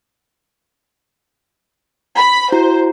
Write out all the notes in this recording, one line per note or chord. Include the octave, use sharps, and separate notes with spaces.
B5
E4 F#4 C5 A#5